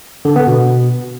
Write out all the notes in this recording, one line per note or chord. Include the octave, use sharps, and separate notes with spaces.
D3
B3
B2